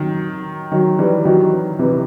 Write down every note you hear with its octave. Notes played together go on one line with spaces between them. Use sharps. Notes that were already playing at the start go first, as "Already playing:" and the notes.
Already playing: D#3 F#3
D#3 F#3
E3 G3
D#3 F#3
C3 E3